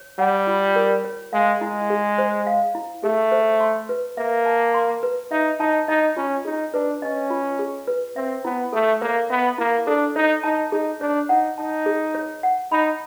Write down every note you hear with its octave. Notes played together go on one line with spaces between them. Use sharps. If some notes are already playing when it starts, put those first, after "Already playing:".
Already playing: C#5
G3 F#5
F4
A#4
C#5
G#3 F5
G#3 E4
G#4
C5
F5
E4
A3 G#4
C5
C6
B4
A#3 E5
A5
C6
B4
D#4 E5
D#4 A5
D#4 D#5
C#4 F4
D#4 G#4
D4 B4
C#4 D#5
F4
G#4
B4
C4 E5
B3 E4
A3 A4
A#3 C#5
B3 E5
A#3 E4
D4 A4
D#4 C#5
D#4 A5
D#4 G#4
D4 C#5
D#4 F#5
D#4 A5
G#4
C#5
F#5
D#4 B5